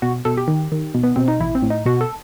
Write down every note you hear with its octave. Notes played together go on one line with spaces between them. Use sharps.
B2 F#4
B2 A4
G4
D#3
D#3
B2
B3
B2 C4
D#4
A1 E4
C4
A2
D#4
B2 F#4
A4